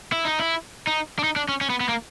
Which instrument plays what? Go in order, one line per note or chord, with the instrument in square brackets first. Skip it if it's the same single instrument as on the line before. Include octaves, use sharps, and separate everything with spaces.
[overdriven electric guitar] E4
D#4
E4
D#4
D4
D#4
D4
C#4
C#4
B3
B3
A#3